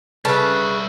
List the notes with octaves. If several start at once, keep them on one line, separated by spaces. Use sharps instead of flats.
C#3 G3 B4 E5 A5